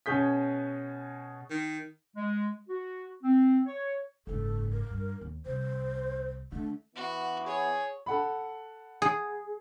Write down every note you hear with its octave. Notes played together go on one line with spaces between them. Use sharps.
B2 C#4 G#4 G6 B6
D#3
G#3
F#4
C4
C#5
F#1 G#2 A4
A#4
G2
D#2
C2 C5
D3 A3
E3 B3 F#4
G#4 C#5
A4 F#5 B5
G#4